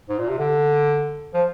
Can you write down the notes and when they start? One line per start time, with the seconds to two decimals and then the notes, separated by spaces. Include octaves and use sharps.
0.09 G#2
0.19 A#2
0.29 C3
0.39 D3
1.34 F3